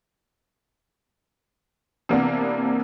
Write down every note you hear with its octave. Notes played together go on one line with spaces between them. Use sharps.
C3 E3 A#3 B3 D4